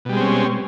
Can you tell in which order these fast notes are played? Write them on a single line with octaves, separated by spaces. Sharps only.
B2 G3 G#3 C4 C#4